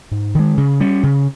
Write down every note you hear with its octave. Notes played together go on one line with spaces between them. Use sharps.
G#2
D#3 G#3
C#3
G3 C#4
C#3